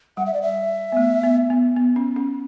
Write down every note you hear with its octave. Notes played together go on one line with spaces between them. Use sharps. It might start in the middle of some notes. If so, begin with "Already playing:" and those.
G3 F#5
E5
D5
E5
B3
A3
B3
B3
B3
C#4
C#4